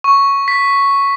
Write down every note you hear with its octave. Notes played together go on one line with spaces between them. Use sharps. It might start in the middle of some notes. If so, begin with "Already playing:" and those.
C#6
B6